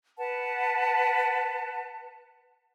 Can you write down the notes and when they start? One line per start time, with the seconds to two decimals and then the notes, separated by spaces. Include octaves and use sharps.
0.18 B4 F#5 A5